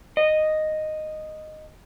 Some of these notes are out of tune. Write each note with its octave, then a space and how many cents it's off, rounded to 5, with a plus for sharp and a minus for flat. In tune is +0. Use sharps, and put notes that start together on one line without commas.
D#5 -5